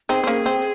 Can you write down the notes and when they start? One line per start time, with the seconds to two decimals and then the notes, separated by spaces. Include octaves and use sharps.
0.09 C4 D#4 G#4
0.23 C4
0.27 A#3 C#4
0.46 C4